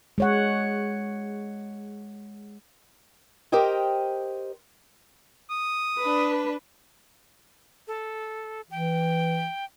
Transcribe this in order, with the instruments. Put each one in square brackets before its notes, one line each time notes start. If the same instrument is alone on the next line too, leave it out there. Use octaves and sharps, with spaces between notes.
[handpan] G#3 C#5 F#5
[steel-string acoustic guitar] G4 A#4 C5 D#5 G5
[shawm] D#6
[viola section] D4 B4
[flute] A4
[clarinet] E3 [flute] G5